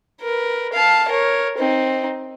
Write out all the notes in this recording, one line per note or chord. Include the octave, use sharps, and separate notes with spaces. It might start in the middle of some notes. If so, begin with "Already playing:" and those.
A#4 B4
F5 A5
A#4 C#5
C4 D#4